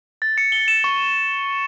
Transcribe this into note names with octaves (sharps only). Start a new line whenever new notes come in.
A6
C#7
G7
E7
C#6